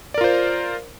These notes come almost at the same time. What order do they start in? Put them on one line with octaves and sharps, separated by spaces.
D5 A#4 F4 C5